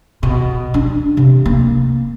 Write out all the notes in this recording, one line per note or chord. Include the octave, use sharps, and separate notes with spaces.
B2
D4
C3
A#3